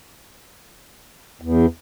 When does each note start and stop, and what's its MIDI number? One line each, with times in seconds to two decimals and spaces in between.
1.42 1.66 40